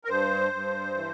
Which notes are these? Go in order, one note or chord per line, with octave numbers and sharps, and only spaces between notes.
A#4
G2 C5
G2
E3